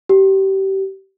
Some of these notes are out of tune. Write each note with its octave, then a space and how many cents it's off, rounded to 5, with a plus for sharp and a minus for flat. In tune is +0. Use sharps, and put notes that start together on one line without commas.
G4 -25